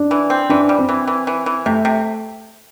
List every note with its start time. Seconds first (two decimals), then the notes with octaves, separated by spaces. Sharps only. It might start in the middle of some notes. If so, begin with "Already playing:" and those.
Already playing: D4
0.11 E3
0.30 C4
0.49 E3 D4
0.69 G3
0.79 C4
0.89 E3
1.08 E3
1.27 E3
1.46 E3
1.66 C3 A3
1.85 C3